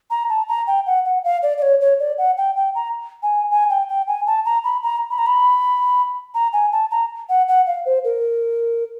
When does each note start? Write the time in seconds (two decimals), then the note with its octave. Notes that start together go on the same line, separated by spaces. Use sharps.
0.10 A#5
0.29 A5
0.48 A#5
0.67 G5
0.86 F#5
1.05 F#5
1.24 F5
1.43 D5
1.58 D5
1.62 C#5
1.81 C#5
2.00 D5
2.18 F#5
2.37 G5
2.57 G5
2.75 A#5
3.23 G#5
3.51 G#5
3.70 G5
3.89 G5
4.08 G#5
4.27 A5
4.45 A#5
4.64 B5
4.83 A#5
5.10 B5
5.18 A#5
5.26 B5
6.34 A#5
6.53 G#5
6.72 A5
6.91 A#5
7.29 F#5
7.48 F#5
7.67 F5
7.86 C5
8.04 A#4